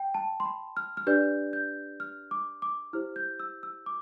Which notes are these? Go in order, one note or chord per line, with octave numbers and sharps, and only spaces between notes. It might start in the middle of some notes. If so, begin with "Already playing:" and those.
Already playing: G5
A5
C6
B5
F6
F6
D4 G4 B4 D5 G6
G6
F6
D6
D6
E4 G4 C5 F6
G6
E6
E6
D6